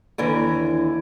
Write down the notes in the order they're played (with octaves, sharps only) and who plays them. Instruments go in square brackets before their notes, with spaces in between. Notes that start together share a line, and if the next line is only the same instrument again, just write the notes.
[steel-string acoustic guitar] D#2 D3 E3